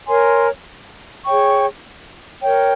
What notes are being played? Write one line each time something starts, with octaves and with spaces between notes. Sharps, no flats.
A#4 C#5 G#5 C6
G#4 C#5 G5 C#6
A#4 C#5 G5